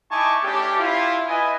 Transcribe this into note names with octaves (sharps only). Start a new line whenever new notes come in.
D#4 E4 G#5 A5 C#6 D6
A3 C#4 D4 G4
E4 F4
E4 B4 D#5 G#5